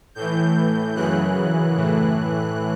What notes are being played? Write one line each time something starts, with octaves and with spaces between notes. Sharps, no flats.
A2 E3 G6
F#2 C#3 E3 F#6
A2 E3